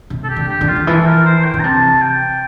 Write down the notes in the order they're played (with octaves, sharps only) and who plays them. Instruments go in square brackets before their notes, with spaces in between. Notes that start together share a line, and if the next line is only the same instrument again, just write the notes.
[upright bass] C3
[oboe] A4
G4
[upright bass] D3
[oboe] G4
[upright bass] D3
[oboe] F4
[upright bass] D3
[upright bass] E3 [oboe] A4
[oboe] A#4
C5
G5
[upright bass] D3
[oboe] A#5
[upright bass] C3 [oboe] A5
[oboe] G5